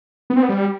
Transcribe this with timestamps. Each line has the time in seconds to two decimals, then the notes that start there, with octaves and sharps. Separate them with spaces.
0.30 B3
0.36 C4
0.42 B3
0.49 G3